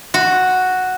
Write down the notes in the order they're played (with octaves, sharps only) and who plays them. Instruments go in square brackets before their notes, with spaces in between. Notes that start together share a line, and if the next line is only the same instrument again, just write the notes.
[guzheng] F#4